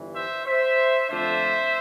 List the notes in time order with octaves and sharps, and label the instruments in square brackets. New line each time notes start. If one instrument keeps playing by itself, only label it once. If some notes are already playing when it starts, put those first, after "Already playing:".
Already playing: [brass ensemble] G1 G2 E3
C5 E5
C5 E5
F2 D3 A3 D4 F4 C5 E5